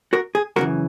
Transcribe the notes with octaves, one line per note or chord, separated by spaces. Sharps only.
F#4 A#4
G#4
F#2 C#3 E3 F#4 A#4